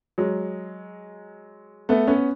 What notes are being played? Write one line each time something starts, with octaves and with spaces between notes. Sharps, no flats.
F#3 G#3
A3 B3
B3 C#4